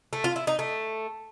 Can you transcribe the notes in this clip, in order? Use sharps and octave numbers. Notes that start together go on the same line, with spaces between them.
A3
F4
E4
D#4
A3